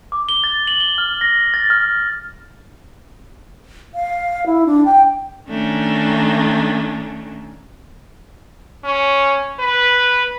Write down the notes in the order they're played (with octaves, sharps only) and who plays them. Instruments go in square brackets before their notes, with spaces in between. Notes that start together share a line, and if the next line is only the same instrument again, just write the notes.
[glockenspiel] D6
G7
A6
F#7
G7
F6
A#6
A6
F6
[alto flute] F5
E4
D4
G5
[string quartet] D#3 A3 C#4 D4
[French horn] C#4
B4